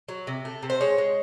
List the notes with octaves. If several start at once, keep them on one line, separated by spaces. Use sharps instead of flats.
F#3
C3
A3
C3
C5
G#3 C#5
G#3